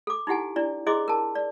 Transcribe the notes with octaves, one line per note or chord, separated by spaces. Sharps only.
A4 D6
D#4 E4 G4 F#5 G#5
D4 E4 D5
E4 G#4 C5 D#5 C6 D6
A#4 A5
D5